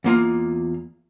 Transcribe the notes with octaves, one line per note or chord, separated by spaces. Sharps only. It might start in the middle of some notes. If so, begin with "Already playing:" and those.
E2 A#3 F4 A#5